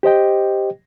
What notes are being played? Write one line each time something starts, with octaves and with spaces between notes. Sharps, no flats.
G4 C5 D#5 G5